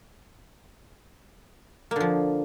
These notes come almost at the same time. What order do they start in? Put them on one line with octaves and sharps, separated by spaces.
A#3 D3 F3